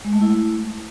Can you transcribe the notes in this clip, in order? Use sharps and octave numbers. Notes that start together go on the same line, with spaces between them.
G#3
A3
E4